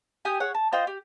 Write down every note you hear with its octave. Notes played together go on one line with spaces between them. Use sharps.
G4 G#5 D#6 G6
G#4 C#5 F#5
A5
F4 C5 D#5 G5
G4